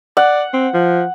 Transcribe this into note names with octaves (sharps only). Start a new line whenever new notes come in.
D5 F#5
C4
F3